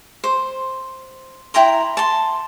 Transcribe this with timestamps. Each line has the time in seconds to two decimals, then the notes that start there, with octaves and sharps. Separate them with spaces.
0.24 C5
1.54 E4 G5 A#5 C6
1.97 A5 C6